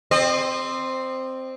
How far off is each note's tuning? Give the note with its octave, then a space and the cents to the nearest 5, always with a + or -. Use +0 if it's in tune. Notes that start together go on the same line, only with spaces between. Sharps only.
C4 +0 D#5 -40